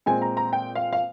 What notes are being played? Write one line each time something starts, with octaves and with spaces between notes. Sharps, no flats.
A#2 G#3 C4 G#5
A#5
A#5
G5
F5
F5